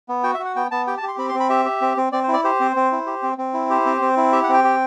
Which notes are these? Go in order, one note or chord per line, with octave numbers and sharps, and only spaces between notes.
B3
F#4 G5
E5
F#4
F#5
B3 G5
B3 A5
G4 G5
A5
G4
C6
C4 B5
C6
C4
B5
G4 E5
G4
C4
C4
C4 D5
C5
E4
D5
G4 C5
C4
C4
E4
G4
C4
C4
E4
G4 C5
C4
C4
E4
G4 E5
F#5
C4 G5
G4